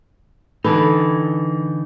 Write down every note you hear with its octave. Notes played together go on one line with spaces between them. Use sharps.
D3 E3 D#4 A4 B4